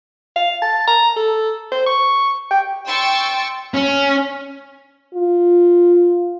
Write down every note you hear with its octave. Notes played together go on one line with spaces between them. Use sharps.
F5
A5
A#5
A4
C5
C#6
G5
G5 C6 C#6 E6 A6
C#4
F4